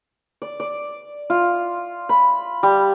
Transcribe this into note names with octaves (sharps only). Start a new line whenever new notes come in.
D5
D5
F4
B5
G3